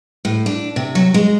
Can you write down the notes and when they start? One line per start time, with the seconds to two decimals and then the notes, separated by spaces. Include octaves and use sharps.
0.25 A2
0.46 D4
0.76 C3
0.95 F#3
1.14 G#3